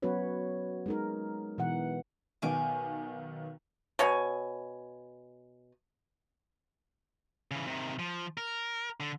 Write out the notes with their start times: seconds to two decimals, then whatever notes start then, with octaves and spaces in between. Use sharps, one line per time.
0.02 F#3 B3 C#4 F#4 B4 C#5
0.86 G#3 D#4 A#4
1.58 B2 E3 F#5
2.42 B1 D#3 B3 G#5 D6
3.99 B2 C#5 G#5
7.51 C#3 E3
7.67 C3 D#3
7.99 F3
8.38 A#4
9.00 D3